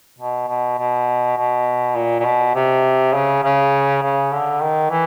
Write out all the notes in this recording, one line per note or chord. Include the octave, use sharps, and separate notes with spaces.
B2
B2
B2
B2
A#2
A#2
B2
C3
C#3
C#3
C#3
D3
D#3
E3